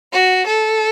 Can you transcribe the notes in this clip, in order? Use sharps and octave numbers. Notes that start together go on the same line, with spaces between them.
F#4
A4